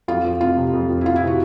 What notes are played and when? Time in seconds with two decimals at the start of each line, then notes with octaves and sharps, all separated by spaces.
0.08 F2 F4
0.24 F3
0.41 F1 F4
0.57 C3
0.73 F2
0.89 F3
1.01 E4
1.05 F1 F4
1.16 E4
1.22 C3 F#4